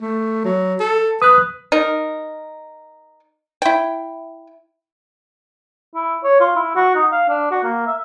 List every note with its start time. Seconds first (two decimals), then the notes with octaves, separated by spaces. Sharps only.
0.01 A3
0.45 F#3
0.80 A4
1.22 B4 D#6 F#6
1.72 D#4 A#4
3.62 E4 G5
5.95 E4
6.24 C#5
6.41 F4
6.56 E4
6.76 F#4
6.95 D#4
7.12 F5
7.29 D4
7.51 F#4
7.64 A#3
7.87 E5